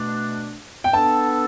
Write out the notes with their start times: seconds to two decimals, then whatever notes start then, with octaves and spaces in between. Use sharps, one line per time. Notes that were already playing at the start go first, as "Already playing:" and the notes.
Already playing: B2 A3 D4
0.84 G5
0.93 B3 D4 A4 A5